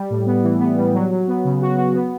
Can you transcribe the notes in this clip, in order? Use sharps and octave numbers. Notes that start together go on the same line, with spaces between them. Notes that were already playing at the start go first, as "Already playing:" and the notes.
Already playing: G3
A2
B3
E3
B3
G3
F#3
F#3
B3
C#3
F#4
F#4
B3